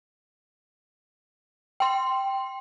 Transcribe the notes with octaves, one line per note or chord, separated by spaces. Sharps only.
G5 C6